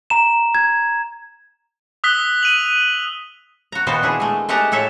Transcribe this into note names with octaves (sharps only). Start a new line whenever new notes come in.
A#5 E7
G#6
D#6 E6 F#6 B6 G7
D#7 F7 F#7
F#4 A#5
A#2 D#3 B3 F#4 C5
D4 E4 G#4
G#3 A3
G#3 A3 G4 F#5 A5 A#5
A2 A4 C#5 E5